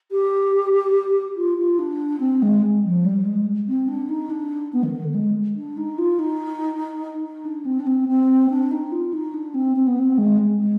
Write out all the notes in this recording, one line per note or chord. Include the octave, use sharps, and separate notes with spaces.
G4
F4
F4
D4
C4
G#3
F3
G3
G#3
C4
D4
D#4
D4
B3
D#3
D#3
D3
G#3
D4
D#4
F4
D#4
D#4
D4
C4
D4
C4
C4
D4
D#4
F4
D#4
D4
C4
C4
B3
C4
G#3
G#3